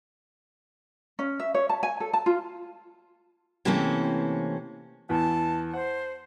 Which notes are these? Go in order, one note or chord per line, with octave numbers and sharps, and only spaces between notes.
C#4
E5
C#5
A5
G#5
A4
A5
F4
C3 E3 A3 A#3 C4 C#4
E2 E3 B3 A5
C5 F#5